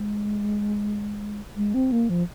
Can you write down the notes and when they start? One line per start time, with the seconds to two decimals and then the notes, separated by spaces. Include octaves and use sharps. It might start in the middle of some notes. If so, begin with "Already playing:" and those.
Already playing: G#3
1.56 G#3
1.74 C4
1.92 A#3
2.10 F3